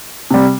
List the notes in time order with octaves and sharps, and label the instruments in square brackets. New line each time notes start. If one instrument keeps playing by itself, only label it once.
[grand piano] C3 G3